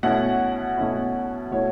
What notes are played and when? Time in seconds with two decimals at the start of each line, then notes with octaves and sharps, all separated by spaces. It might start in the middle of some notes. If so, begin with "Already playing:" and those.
0.03 B2 A3 C#4 E4 F#5
0.77 B2 A3 C#4 E4
1.51 B2 A3 E4 C#5